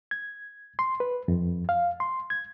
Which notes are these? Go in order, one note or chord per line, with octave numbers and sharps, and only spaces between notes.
G#6
C6
B4
F2
F5
C6
G#6